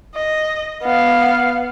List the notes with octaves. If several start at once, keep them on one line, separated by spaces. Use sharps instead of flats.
D#5
B3 F5